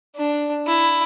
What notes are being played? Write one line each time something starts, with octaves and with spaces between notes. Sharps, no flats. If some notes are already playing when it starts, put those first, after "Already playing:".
D4
E4